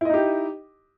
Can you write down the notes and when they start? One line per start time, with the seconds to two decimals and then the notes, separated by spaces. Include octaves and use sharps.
0.01 E4
0.05 D#5
0.10 D#4
0.14 G4